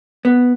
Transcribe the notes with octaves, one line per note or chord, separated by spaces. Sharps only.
B3